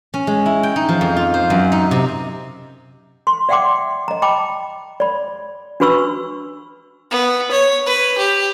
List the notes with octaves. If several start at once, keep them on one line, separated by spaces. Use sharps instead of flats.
C#4
G#3
E4
G5
D#4
F3
F2
F4
C5
F#2
D#4
C3
C6
D5 E5 F#5 G5 C6 D6
D#5 A#5
D#5 G5 A5 B5 D6
D5 B5
D4 F#4 B4 B5 C#6 E6
B3
C#5
B4
G4